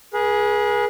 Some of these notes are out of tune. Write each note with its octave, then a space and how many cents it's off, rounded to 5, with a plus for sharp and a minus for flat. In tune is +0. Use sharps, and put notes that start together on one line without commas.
G#4 +0 B4 -45